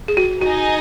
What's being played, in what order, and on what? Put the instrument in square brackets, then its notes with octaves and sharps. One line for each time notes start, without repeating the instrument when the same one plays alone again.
[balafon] G#4
F#4
[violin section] D#4 G#4 D#5 G#5 [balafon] F#4